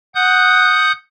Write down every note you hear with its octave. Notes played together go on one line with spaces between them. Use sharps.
F#5 D#6 F#6 G6